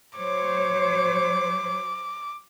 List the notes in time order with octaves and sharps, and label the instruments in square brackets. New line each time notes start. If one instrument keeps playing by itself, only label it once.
[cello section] F#3 C5 C#5 [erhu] D6